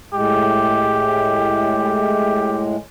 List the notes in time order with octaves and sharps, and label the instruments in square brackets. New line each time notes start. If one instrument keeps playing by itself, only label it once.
[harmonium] A2 G#3 [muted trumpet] G4